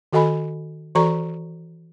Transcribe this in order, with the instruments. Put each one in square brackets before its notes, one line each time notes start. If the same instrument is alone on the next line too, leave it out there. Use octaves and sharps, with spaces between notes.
[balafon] D#3 F#4 A4 D#5 G#5 B5
E3 F#4 A4 D5 A#5 C#6